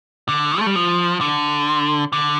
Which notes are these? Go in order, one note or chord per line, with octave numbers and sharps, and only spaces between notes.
D3
A3
G3
F3
D3
D3